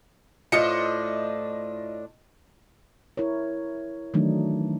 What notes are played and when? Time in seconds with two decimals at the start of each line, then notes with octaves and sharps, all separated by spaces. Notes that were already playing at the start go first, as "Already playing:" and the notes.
0.52 A2 D4 F4 C5 D#5 C#7
3.17 E4 A#4 C#5
4.14 D#3 E3 F#3 A3 D4 D#4